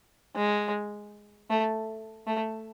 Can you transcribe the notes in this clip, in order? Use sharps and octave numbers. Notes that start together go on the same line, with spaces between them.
G#3
A3
A3